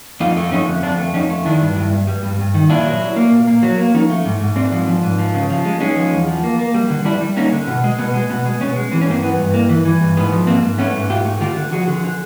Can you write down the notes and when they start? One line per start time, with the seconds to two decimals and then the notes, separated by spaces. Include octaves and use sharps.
0.20 F2 D#4 F4
0.36 A3
0.51 F2 C#4 D#4
0.67 D3
0.83 F2 C4 D4
0.98 A3
1.13 F2 C#4 D#4
1.30 A3
1.45 D#3 D4 E4
1.61 G2
1.76 G2
1.92 G2
2.07 G3
2.23 G2
2.39 G2
2.54 D#3
2.69 A#2 D4 E4
2.85 F#3
3.01 F#3
3.16 A#3
3.32 A#2
3.47 A#3
3.63 F#3
3.78 A#3
3.94 F3 C#4 D#4
4.10 A3
4.25 G#2
4.41 G#2
4.56 G#2 C4 D4
4.72 F3
4.87 F3
5.03 G#2
5.18 F3
5.34 C#3
5.50 F3
5.65 G#3
5.80 G#3 C#4 D#4
5.96 F3
6.12 E2
6.27 F3
6.43 A#3
6.59 A#3
6.74 G3
6.90 D3
7.05 G3 D4 E4
7.21 G3
7.37 A#3 C#4 D#4
7.52 D3
7.67 B2
7.84 G#3
7.98 B2 B3
8.14 G#3
8.30 B2 B3
8.45 G#3
8.61 B2 B3 C#4
8.76 G#3
8.92 E3 C4
9.01 C#4
9.07 G2 A#3 C4
9.22 E3 B3
9.38 G2
9.54 G2 A#3
9.69 E3
9.85 E3
10.01 G2
10.17 G#2 B3
10.32 F3
10.47 G#2 A#3 C4
10.63 G#2
10.78 A3 B3 C#4
10.95 G#2
11.10 G#2 F4 G4
11.25 A3
11.40 D3 F4 G4
11.56 D3
11.72 F3 F#4 G#4
11.87 D3
12.04 D3